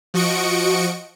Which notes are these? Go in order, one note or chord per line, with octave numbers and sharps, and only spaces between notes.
F3 F#4 D#5 C#6 C#7 D7